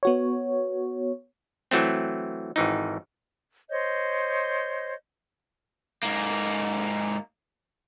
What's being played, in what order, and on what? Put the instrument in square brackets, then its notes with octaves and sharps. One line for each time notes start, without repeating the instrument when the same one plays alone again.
[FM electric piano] B3 F#4 C#5
[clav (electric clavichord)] E3 F#3 A3 C4
G#1 E3 D#4
[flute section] C5 C#5 D#5 G6
[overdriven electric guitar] G#2 A#3